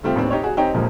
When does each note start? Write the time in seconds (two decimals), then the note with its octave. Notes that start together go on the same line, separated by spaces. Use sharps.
0.03 G3 A3 C4 F4 G4
0.16 A1 D#2 C4 D4
0.31 D#4 G4 C#5
0.43 F#4 G#4
0.57 C4 D#4 G4 C#5 G5
0.74 D#1 A#1 F3 G#3 A#3 G#4